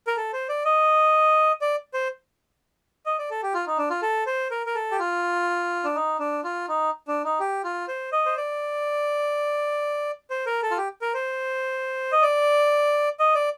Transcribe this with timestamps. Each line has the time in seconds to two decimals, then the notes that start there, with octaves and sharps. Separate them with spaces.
0.07 A#4
0.17 A4
0.33 C5
0.49 D5
0.65 D#5
1.61 D5
1.94 C5
3.06 D#5
3.19 D5
3.30 A4
3.43 G4
3.54 F4
3.67 D#4
3.78 D4
3.90 F4
4.02 A4
4.26 C5
4.51 A#4
4.66 A#4
4.75 A4
4.91 G4
4.99 F4
5.84 D4
5.95 D#4
6.19 D4
6.44 F4
6.68 D#4
7.08 D4
7.24 D#4
7.40 G4
7.64 F4
7.88 C5
8.12 D#5
8.26 C5
8.37 D5
10.30 C5
10.46 A#4
10.63 A4
10.71 F4
10.77 G4
11.02 A#4
11.14 C5
12.12 D#5
12.22 D5
13.20 D#5
13.35 D5